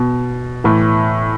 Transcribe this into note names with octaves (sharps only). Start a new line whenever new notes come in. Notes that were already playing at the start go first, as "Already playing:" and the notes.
Already playing: B2
A2 E3